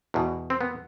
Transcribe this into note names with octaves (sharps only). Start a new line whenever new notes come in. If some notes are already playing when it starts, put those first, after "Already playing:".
E2 B2
C4
B3